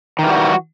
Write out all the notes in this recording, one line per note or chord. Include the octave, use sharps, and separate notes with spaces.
D#3 E3 G3 F#4